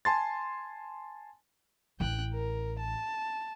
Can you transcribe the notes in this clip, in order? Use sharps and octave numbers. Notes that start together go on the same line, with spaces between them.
G#5 A5 C6 A6
A1 E4 G5 F#6
A#4
A5